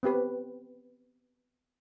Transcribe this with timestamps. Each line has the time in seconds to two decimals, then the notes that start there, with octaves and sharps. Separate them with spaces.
0.03 B3 C4 G4 B4